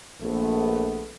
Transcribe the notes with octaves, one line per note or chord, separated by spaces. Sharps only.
A#1 A3 B3